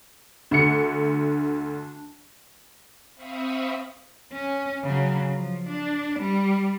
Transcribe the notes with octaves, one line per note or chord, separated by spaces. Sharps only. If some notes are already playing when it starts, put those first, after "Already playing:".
D2 D3 D4 C#7
C4 E5 F5 B5 C#6 D#6
C#4
C#3 F#3
F3
D4
G3